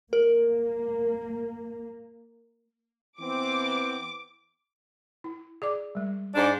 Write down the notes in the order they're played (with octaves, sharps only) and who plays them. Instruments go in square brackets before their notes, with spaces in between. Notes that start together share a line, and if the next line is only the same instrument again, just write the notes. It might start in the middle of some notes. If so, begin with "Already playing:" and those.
[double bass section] A#3 [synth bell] A#4
[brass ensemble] E3 B3 C4 [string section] D6
[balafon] E4
G#4 D5 D6
G3 G#3
[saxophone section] G#2 D4